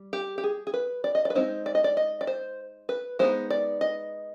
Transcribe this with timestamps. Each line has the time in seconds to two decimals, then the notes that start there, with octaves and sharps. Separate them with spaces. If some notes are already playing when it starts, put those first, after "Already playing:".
Already playing: G3
0.13 G4
0.38 G4
0.44 G#4
0.67 G#4
0.74 B4
1.04 D5
1.15 D#5
1.25 D5
1.30 B4
1.35 G#3 C4 D#4 C5
1.66 D5
1.75 D#5
1.84 D5
1.97 D#5
2.21 D5
2.27 C5
2.89 B4
3.19 G#3 B3 D#4 C5
3.50 D5
3.81 D#5